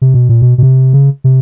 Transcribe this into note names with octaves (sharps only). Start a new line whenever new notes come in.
C3
B2
A#2
B2
B2
C3
C#3
C3